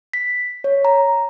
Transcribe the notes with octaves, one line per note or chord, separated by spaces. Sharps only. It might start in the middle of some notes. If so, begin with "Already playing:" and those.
B6
C#5
A#5